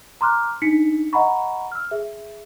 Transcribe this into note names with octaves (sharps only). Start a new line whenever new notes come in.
A#5 C6 D6 F6 F#6
D4 D#4 B6 C#7
D#5 F#5 A#5 B5 C#6
E6 F6
G#4 E5